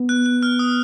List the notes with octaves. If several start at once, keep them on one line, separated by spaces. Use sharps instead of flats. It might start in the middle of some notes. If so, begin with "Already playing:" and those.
Already playing: B3
F#6
F#6
F6
D#6